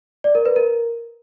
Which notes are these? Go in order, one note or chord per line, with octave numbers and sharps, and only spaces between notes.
D5
A#4
B4
A#4